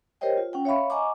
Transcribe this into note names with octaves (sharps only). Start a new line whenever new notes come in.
G4 A#4 C5 C#5 D#5 G5
F4
C#4 F#5 G5
C#5 E5 F5 B5 C#6
D#5 F#5 G#5 A#5 C#6 D6